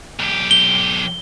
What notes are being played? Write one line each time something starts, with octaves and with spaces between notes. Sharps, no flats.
B1 G4
G7